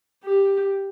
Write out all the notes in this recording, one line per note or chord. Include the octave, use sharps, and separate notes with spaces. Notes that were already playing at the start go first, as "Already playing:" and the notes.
G4